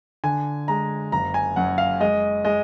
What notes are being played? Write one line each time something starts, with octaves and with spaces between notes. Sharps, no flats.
D3 G#5
G#3 A#5
F#1 A#5
G#5
F#2 F#5
F5
G#3 D#5
G#3 D#5